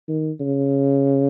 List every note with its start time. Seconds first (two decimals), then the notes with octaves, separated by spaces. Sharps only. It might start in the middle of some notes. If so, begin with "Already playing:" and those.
0.09 D#3
0.40 C#3